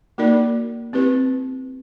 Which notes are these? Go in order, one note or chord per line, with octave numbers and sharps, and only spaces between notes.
A#3 D#4 F#4 A#4 D5
C4 E4 G4 B4